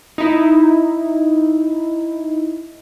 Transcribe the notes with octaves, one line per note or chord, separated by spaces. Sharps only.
D#4 E4